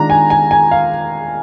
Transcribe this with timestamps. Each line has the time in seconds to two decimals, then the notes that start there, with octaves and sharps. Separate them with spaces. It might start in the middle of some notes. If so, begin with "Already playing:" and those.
Already playing: D#3 G#3 D4 F4 A#5
0.10 G#5
0.30 G#5
0.51 G#5
0.72 F5